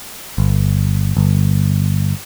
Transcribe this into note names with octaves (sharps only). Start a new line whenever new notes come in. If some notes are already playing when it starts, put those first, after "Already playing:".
G1
G1